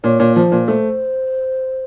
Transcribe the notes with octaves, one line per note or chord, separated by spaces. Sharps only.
A#2 C#5
A#2
F3 C5
A#2
A3 C5